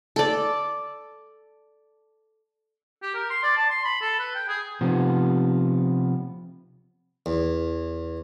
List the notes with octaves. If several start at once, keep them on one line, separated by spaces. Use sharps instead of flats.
A4 D5
G4
A#4
C6
D5
A5
C6
B5
A4
B4
G5
G#4
C3 F3 B3
E2